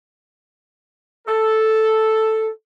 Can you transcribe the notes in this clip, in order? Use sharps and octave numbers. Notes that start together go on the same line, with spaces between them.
A4